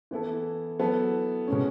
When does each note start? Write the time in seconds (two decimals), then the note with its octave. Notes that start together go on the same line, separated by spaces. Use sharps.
0.11 E3 B3 E4 A4
0.79 F#3 B3 E4 A4
1.47 B2 G#3 C#4